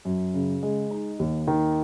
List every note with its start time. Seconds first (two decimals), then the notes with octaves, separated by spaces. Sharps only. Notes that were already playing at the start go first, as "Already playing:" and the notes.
0.05 F#2
0.34 C#3
0.63 G#3
0.91 D#4
1.19 D#2
1.47 D#3